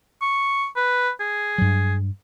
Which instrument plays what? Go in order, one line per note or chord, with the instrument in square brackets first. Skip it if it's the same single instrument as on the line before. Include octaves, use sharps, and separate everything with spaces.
[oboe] C#6
B4
G#4
[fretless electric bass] G2 F#3